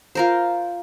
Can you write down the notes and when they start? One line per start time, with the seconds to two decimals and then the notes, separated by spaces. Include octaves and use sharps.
0.15 F4 A#4 C5